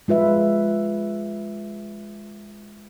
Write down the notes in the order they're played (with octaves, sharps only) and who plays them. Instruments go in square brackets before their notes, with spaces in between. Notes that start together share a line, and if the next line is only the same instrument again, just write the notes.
[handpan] G#3 F4 B4 E5